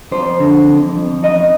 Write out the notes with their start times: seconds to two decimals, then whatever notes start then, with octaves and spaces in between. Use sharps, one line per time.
0.11 F2 C5
0.39 D3
0.68 F2
0.96 F2
1.23 D#4 D#5